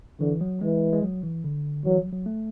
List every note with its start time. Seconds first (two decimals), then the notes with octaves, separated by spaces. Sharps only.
0.21 D3 E3
0.41 F#3
0.61 E3 G#3
0.93 G#3
1.03 F#3
1.23 E3
1.44 D3
1.85 E3 F#3
1.98 F#3
2.12 F#3
2.26 A3